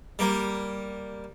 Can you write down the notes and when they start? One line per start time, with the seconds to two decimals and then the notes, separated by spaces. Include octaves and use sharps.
0.19 G3 A#3